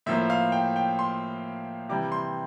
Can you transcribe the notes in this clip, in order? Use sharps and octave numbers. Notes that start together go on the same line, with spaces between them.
A2 F3 A#3 E5
F5
G5
G5
C6
C3 E3 G3 D6
C6